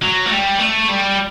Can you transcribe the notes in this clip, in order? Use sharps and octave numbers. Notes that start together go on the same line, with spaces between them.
F#3
A3
G3
A3
G3